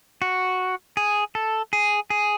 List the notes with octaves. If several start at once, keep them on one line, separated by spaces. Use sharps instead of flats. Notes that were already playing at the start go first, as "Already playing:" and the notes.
F#4
G#4
A4
G#4
G#4